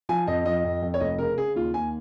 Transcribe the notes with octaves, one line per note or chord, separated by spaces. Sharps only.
F3 G#5
F2 D#5
F3 D#5
F2
F2
C#5
F1 D#5
C#3 A#4
C#3 G#4
D#2 F4
D#2 G#5